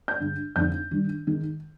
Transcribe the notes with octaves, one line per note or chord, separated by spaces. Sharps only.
G6
G2 D3 G#3
F2 D3 G#3 D#4 G6
D#3 G3 D4
D#3 G#3 D#4